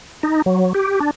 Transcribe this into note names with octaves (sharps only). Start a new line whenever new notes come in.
D#4
F#3
G4
D4